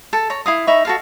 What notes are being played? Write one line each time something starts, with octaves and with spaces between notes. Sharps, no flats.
A4
C#5 A#5
E4 F5 D#6
D#4 E5 B5 C#6
F#4 A4 F5